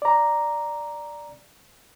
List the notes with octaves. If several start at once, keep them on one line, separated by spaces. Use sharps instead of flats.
D5 A#5